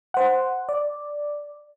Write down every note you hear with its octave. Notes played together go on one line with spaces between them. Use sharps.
C5 F#5
D5